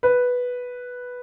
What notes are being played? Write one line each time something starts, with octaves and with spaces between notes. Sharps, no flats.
B4